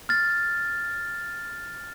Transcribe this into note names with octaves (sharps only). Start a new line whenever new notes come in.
F6 A6